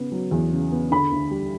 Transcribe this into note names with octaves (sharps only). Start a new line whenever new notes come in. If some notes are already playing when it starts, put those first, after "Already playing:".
Already playing: C#3 B3
F#3
E2
C#3
B3
D3 B5
D2
G3